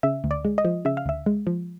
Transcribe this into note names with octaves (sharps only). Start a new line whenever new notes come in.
C#3 E5
D2
D5
G#3
D#5
F3
C#3 E5
F5
D2 E5
G#3
F3